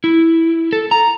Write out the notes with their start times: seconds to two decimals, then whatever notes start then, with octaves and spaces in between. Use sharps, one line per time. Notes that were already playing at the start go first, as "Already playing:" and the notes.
0.04 E4
0.73 A4
0.91 A#5